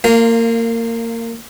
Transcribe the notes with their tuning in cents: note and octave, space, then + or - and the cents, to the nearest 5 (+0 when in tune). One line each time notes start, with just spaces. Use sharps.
A#3 -25 F4 +0